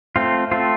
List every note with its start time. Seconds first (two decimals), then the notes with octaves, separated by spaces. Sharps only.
0.16 A3 C4 F4
0.51 A3 C4 F4